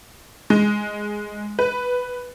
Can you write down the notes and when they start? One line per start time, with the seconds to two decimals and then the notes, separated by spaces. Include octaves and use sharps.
0.50 G#3
1.59 B4